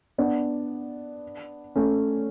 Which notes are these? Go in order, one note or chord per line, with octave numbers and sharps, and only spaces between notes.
B3 D4
A3 C#4